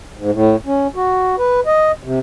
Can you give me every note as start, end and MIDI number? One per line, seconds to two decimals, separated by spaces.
0.17 0.31 44
0.32 0.56 45
0.66 0.87 61
0.95 1.36 66
1.38 1.60 71
1.66 1.92 75
2.03 2.19 48